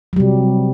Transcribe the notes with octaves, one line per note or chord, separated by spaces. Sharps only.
C3 F#3 G3